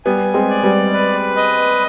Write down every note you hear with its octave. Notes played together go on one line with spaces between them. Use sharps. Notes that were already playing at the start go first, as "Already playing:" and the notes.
G3 B3 G#5
G#3 C4
D5
G3 B3
B4
D#5